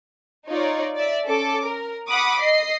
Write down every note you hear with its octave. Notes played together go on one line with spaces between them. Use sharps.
D#4 F4 C#5 D5
D5 E5
C#4 A4 D6
A#4
F#5 B5 D6 D#6
D#5 C7